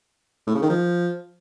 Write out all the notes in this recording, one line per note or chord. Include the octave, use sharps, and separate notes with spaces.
A2
C#3
D#3
F3